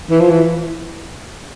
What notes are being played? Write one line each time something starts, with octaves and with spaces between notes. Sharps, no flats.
E3
F3
E3